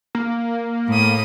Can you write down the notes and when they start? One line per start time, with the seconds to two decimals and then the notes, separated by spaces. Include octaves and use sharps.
0.15 A#3
0.88 A2 D#6